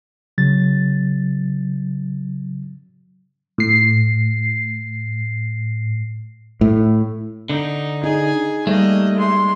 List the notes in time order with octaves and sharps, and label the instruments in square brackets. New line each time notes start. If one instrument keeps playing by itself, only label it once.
[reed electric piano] C#3 F#3 A6
[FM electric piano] A2 C7
[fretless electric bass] A2
[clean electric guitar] D3 [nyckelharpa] D#4
[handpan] D#4 [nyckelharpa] G#4 G#5
[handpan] G3 [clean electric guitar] A3 [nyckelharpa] A#3 D#5
[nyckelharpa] G#3 C6